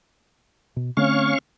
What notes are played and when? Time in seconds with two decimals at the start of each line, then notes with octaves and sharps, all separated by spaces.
0.76 B2
0.97 D3 A3 C4 C#4 F5 C#6